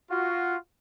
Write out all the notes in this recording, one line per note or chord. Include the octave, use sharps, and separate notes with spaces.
F4 F#4